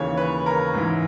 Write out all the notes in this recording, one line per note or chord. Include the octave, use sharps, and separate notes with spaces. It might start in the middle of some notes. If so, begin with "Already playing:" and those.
Already playing: D#2 C#3 E3 C#5
B4
A#4
G#2 E3